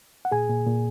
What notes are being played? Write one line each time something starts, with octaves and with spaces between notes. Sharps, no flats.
F#5
A#2 G#4 G#5
A#2
A#2